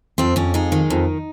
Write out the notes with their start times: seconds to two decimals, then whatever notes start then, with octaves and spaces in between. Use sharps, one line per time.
0.18 F2 C4
0.36 F2 C#4
0.54 G#3 D#4
0.72 D#3
0.90 F2